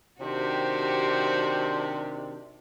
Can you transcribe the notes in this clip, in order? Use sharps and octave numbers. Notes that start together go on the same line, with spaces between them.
C3 D#3 D4 F#4 G4 C5